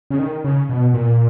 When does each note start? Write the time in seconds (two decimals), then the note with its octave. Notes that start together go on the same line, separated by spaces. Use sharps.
0.10 C#3
0.19 D#3
0.44 C#3
0.69 B2
0.94 A#2